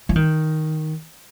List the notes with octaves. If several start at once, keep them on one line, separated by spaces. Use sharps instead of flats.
F3
D#3